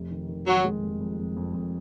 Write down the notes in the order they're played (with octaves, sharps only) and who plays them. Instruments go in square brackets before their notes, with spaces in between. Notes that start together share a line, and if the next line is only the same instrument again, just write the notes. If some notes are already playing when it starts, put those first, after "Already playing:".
Already playing: [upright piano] F1
D#3
D#3
[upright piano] D#3 [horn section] F#3
[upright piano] G#3
F1
F2
F2
F2
F2